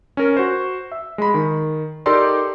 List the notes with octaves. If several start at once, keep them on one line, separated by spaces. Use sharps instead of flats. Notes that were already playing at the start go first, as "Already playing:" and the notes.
C#4 A#4
F#4 C5
E5
G#3 B5
D#3
D#4 G4 A4 A#4 D5 C6